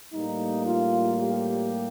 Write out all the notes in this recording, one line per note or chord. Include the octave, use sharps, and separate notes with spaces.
A2 G3 A#3 D#4
F4
G4